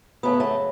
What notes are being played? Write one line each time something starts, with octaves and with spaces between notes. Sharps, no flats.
F#2 C#3 F#3 A3 B3
A3